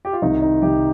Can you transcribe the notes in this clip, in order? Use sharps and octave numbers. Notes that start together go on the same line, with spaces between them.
G4
F4
C2 C3 D#3 D#4
D#4
C2 C3 D#3 G4